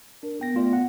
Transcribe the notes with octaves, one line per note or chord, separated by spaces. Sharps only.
D4 A#4
B3 G5 A#6
A3 F4 D5
F#5